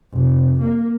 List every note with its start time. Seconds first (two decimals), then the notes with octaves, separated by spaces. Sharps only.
0.12 F1
0.61 A#3